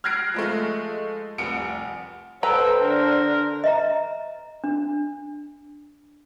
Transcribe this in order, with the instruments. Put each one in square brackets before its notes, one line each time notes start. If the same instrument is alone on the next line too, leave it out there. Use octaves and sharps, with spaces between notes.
[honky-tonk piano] F6 F#6 G#6 A#6 C7 D7
F3 G#3 A3
F1 C2 C#7 D7
[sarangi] A4 [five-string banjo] B4 G5 A#5 [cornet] C5 [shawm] E5
[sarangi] D3 [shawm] A#4
[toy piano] D#5 E5 A#5
D4